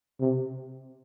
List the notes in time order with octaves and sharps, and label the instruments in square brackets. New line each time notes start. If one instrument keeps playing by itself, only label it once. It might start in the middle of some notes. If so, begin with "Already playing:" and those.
[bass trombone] C3